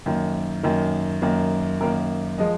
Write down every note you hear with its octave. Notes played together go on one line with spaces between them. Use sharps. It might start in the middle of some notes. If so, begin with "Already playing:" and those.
F#2 D#3 A#3
F#2 D#3 A#3
F#2 D#3 A#3
F#2 D#3 A#3 A#4
F3 G#3 D#5